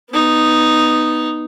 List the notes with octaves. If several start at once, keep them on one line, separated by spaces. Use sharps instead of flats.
B3 D#4